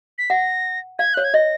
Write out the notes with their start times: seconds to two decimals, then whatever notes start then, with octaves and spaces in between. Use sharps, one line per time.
0.18 B6
0.30 F#5 A#6
0.99 F5 G#6
1.14 C#5 F#6
1.24 G#6
1.34 D#5 A#6